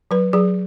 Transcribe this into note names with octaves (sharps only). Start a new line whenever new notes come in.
F#3 B4
F#3 G#4